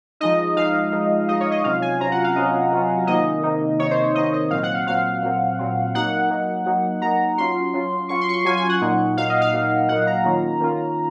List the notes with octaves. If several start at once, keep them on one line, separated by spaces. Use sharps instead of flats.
F3 G#3 D#4 D#5
F3 G#3 D#4 F5
F3 G#3 D#4
F3 G#3 D#4 D#5
C#5
D#5
C3 F#3 C#4 F4 F5
G#5
C3 F#3 C#4 F4 A#5
F#5
F5
C3 F#3 C#4 F4 D#5
C3 F#3 C#4 F4
C3 D#3 A#3 D#4 D#5
C3 D#3 A#3 D#4
C3 D#3 A#3 D#4 C#5
C5
C#5
C3 D#3 A#3 D#4 D#5
D#5
A#2 F#3 C4 F5
F#5
F5
A#2 F#3 C4 F5
A#2 F#3 C4
A#2 F#3 C4
F#3 A#3 D#4 F#5
F#3 A#3 D#4
F#3 A#3 D#4
F#3 A#3 D#4 A#5
F#3 C#4 F4 C6
F#3 C#4 F4
F#3 C#4 F4 C#6
C6
C#6
C6
F#3 C#4 F4 G#5
G#5
F#5
A#2 F#3 A#3 D#4
A#2 F#3 A#3 D#4 F5
D#5
F5
A#2 F#3 A#3 D#4
A#2 F#3 A#3 D#4 F#5
A#5
D#3 A#3 C#4 F4
D#3 A#3 C#4 F4